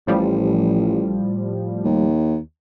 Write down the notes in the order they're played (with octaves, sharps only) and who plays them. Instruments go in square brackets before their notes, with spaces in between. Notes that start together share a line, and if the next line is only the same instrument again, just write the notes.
[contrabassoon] A1 [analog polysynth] A2 F3 G3
[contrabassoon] D#2